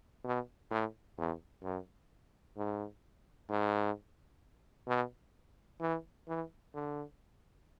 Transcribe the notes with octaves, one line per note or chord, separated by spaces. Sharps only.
B2
A2
E2
F#2
G#2
G#2
B2
E3
E3
D3